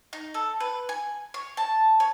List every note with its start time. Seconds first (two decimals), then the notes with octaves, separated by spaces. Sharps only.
0.13 D#4
0.34 A4
0.60 B4
0.89 G#5
1.34 C#5
1.57 A5
2.00 C#5